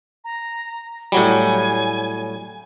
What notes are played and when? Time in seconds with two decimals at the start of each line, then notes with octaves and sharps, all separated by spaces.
0.24 A#5
1.12 A2 F#3 G3 G#5